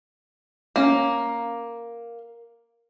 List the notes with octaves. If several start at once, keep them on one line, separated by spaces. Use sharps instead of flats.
A#3 C#4 A#5